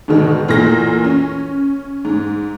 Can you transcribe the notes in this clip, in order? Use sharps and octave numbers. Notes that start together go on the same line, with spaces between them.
G#2 B2 D3 D#3
E2 A#2 E3 A3 A#6
C#4
G#2